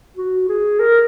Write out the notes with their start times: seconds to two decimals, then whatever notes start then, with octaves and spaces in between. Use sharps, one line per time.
0.16 F#4
0.49 G#4
0.80 A#4